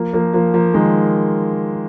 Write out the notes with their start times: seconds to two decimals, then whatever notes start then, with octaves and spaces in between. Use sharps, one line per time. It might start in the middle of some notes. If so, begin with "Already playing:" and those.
Already playing: F3 A#3
0.13 F3 A#3
0.34 F3 A#3
0.54 F3 A#3
0.74 D#3 G#3